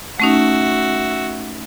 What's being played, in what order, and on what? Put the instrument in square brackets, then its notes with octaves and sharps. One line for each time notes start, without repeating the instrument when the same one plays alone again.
[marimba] A3 C#4 D#4 [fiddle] F#4 E5